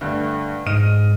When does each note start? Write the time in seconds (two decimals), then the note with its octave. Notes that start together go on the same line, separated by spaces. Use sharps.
0.01 G2 D3 A3
0.66 G#2 D#5 F6 D#7